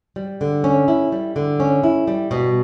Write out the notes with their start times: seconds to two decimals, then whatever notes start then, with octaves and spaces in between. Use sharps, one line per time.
0.16 G3
0.41 D3
0.64 C#4
0.88 E4
1.12 G3
1.36 D3
1.60 C#4
1.84 E4
2.07 G3
2.31 B2